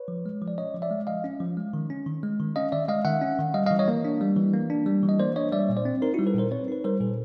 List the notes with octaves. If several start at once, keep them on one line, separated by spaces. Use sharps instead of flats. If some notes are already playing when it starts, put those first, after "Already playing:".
Already playing: B4 C#5
F3
G#3
F3
D5
C#4 C#5 D#5
F3
D5 E5
G#3
F3 D#5 F5
C#4
F3
G#3
D#3
C#4
D#3
G#3
D#3
C#4 D#5 F5
D#3 D5 E5
G#3 D#5 F5
D#3 E5 F#5
C#4
D#3
G3 D#5 F5
D#5 F5
E3
C#5 D#5
A#3
D4
G3
E3
A#3
D4
G3
E3
D#5
A#3 C5 D5
D4 C#5 D#5
G3 D5 E5
A#2
C5 D5
C4
D#4 A#4 C5
E4 F#4
G3
A4 B4
A#2 A#4 C5
C4 B4 C#5
D#4 B4
G3 A#4 C5
A#2 A4 B4